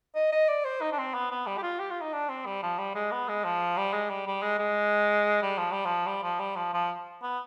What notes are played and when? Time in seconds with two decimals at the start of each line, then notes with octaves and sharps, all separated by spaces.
0.15 D#5
0.32 D#5
0.49 D5
0.65 C5
0.81 D#4
0.92 D4
0.98 C4
1.14 B3
1.31 B3
1.47 G3
1.57 G4
1.63 F4
1.79 G4
1.91 F4
2.01 D#4
2.13 D4
2.29 C4
2.46 G3
2.63 F3
2.79 G3
2.95 G#3
3.11 B3
3.28 G#3
3.44 F3
3.78 G3
3.93 G#3
4.10 G3
4.27 G3
4.42 G#3
4.59 G#3
5.42 G3
5.58 F3
5.72 G3
5.85 F3
6.07 G3
6.23 F3
6.40 G3
6.56 F3
6.74 F3
7.23 B3